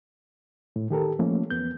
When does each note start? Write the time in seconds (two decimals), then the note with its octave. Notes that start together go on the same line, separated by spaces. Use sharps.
0.76 A2
0.90 D#3 G4 A4 A#4
1.19 F3 A3 A#3 C#4
1.50 E2 B3 G6